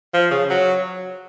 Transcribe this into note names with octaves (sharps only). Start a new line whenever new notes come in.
F3
C#3
F#3